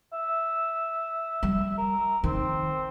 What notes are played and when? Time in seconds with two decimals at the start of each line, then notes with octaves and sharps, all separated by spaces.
0.13 E5
1.43 G3
1.78 A#4
2.24 D#3 C4